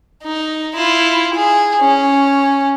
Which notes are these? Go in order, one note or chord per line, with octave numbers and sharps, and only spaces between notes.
D#4
E4 F4
G#4
C#4